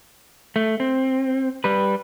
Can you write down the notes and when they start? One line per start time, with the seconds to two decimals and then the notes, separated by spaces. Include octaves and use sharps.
0.56 A3
0.80 C4
1.64 G3 B4